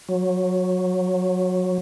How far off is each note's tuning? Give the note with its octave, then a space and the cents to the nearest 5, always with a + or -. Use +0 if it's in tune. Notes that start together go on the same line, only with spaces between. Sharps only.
F#3 -20